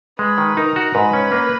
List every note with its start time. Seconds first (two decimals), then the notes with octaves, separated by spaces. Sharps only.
0.19 G#3 B4
0.38 D#3
0.57 D#4 A#4
0.76 F#4
0.94 G#2 B4
1.13 C#4
1.32 A#3